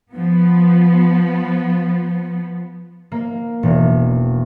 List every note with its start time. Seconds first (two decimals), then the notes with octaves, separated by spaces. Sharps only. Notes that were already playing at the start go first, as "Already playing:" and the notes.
0.12 F3 B3
3.12 A#3
3.63 E1